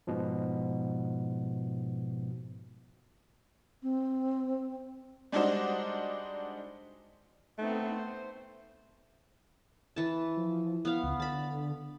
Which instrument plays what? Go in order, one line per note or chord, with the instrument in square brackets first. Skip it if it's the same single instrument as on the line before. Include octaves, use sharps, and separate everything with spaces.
[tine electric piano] G#2 B2 F3
[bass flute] C4
[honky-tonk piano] G3 G#3 D4 D#4 F#4 C5
[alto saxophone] A3 [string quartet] B3 C4 D#4
[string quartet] C5
[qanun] E3 A5
[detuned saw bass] F3
[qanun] B3 F5 [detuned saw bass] E4
[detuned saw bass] C#2
[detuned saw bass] D3 [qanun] A5 B5